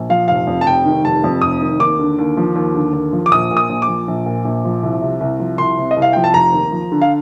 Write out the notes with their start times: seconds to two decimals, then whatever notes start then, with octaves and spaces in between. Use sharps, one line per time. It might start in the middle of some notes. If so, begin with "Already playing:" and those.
Already playing: A#1
0.10 F3 F5
0.28 F1 F5
0.47 F2
0.61 A5
0.66 F1 G5
0.85 D#3
1.04 F1 A5
1.24 F2
1.42 F1 D#6
1.61 D#3
1.80 D#2 D6
1.99 D3
2.18 D#2
2.37 F3
2.56 D#2
2.74 D3
2.93 D#2
3.13 F3
3.26 D6
3.31 A#1 D#6
3.51 A#2
3.57 D#6
3.69 A#1
3.82 D6
3.88 F3
4.08 A#1
4.26 A#2
4.45 A#1
4.65 F3
4.83 C2
5.02 C3
5.20 C2
5.39 F3
5.58 C2 C6
5.78 C3
5.91 D#5
5.97 C2
6.02 F5
6.13 F3 G5
6.24 A5
6.34 F1 A#5
6.53 D#2
6.72 F3
6.92 D3
7.02 F5